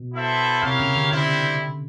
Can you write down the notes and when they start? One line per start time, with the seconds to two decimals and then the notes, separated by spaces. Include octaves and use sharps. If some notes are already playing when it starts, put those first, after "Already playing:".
Already playing: B2
0.14 B3 E4 A4 C5 E5
0.62 C3 E4 G4 A#4 C#5 F5
0.80 C#3
0.96 D3
1.11 D3 G3 C4 E4